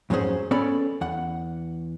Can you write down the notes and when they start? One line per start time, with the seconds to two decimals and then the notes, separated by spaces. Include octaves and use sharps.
0.10 F2 G#2 F#3 C#4 G#4 C5
0.51 B3 C#4 A4 C#5 D5 B5
1.01 E2 F#5